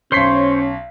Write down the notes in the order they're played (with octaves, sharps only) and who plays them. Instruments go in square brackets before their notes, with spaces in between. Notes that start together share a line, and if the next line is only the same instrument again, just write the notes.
[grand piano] B1 B6 C7 [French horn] C#4 [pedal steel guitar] C5 C#5 C6